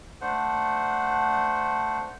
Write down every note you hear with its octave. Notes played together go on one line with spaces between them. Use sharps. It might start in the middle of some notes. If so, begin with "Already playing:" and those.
A3 D4 C5 F#5